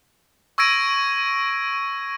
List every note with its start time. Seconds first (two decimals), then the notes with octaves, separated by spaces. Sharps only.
0.58 C#6 E6 G#6 A#6 D7 D#7